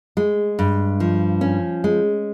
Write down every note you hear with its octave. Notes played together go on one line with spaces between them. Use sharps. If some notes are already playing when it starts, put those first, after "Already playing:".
G#3
G2
F3
C#4
G#3